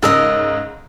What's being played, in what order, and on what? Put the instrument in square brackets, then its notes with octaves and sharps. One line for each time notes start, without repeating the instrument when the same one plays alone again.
[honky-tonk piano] G#2 C#3 E6 [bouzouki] A4 A#4 D#5